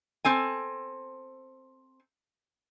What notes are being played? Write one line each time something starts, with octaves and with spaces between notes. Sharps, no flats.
C4 A4 G#5